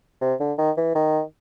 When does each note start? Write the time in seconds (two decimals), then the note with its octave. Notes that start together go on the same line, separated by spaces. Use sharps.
0.21 C3
0.40 D3
0.58 D#3
0.77 E3
0.95 D#3